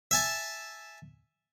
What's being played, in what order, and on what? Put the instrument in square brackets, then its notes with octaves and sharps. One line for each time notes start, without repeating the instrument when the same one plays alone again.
[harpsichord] E5 G#5 A5